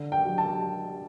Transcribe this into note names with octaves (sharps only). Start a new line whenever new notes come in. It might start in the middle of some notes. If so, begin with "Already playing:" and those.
Already playing: D3
G5
F#3
A5